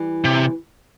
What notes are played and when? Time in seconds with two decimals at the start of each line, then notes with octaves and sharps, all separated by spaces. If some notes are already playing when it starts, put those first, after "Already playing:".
Already playing: E3 G3
0.25 C3